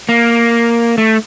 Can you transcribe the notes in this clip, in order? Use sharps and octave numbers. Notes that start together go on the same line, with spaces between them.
A#3
A3